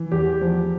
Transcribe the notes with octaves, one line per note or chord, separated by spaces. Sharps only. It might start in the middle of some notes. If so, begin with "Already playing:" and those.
Already playing: E3
E2 G4
F3